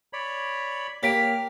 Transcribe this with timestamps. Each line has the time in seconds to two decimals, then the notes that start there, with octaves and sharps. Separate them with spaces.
0.13 C#5 D5 B5
1.03 A#3 G4 C#5 F6 B6 D7